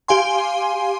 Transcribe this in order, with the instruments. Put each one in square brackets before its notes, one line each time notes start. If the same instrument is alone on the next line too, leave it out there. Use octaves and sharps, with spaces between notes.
[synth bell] G4 F5 G#5 C6